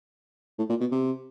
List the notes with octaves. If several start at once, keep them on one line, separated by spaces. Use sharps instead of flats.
A2
A#2
B2
C3